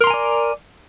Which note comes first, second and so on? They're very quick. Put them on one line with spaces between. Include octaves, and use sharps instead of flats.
A#4 C6 A#5 G#5 D5